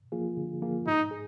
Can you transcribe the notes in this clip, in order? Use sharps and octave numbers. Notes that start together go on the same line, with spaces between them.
F3 A#3 F4 G#4
D3
F3 A#3 F4 G#4
G#2 D#4
G#4